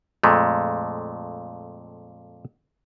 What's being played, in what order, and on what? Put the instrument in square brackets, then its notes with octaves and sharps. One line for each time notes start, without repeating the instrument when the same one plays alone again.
[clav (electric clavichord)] F2 A#2 G#3 A3